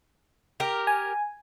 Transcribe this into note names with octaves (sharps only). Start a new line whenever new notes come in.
G4 A#4
G#5